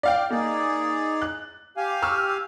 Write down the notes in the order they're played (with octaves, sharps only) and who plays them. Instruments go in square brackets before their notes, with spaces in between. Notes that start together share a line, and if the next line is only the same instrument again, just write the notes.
[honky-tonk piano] D5 F5 G5
[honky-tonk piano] A#3 [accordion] D#4 G#4 D5
[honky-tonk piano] F#6
[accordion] G4 F5 G#5
[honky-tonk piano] C#6 E6 F6